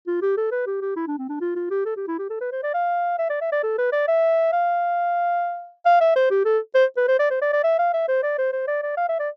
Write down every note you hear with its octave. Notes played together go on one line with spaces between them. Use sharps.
F4
G4
A4
B4
G4
G4
E4
D4
C4
D4
F4
F4
G4
A4
G4
E4
G4
A4
B4
C5
D5
F5
E5
D5
E5
D5
A4
B4
D5
E5
F5
F5
E5
C5
G4
A4
C5
B4
C5
D5
C5
D5
D5
E5
F5
E5
C5
D5
C5
C5
D5
D5
F5
E5
D5